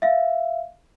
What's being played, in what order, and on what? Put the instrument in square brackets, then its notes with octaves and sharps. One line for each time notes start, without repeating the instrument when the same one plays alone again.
[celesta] E5 F5